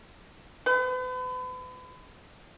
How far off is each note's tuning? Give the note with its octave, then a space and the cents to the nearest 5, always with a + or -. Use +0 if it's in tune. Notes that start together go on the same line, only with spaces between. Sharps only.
B4 +40